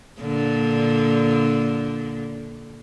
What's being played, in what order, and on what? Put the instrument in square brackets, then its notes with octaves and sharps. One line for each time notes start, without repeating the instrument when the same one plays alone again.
[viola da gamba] A#2 D3